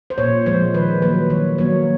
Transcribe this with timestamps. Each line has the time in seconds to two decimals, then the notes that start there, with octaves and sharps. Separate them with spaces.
0.10 C5
0.18 A#2 C#5
0.46 F3 G#3 C5
0.74 D#3 B4
1.02 F#3 A#3 B4
1.30 D#3 C#5
1.58 F#3 A#3 C#5